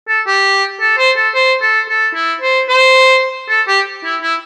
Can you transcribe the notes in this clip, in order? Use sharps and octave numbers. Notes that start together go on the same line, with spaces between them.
A4
G4
A4
C5
A4
C5
A4
A4
E4
C5
C5
A4
G4
E4
E4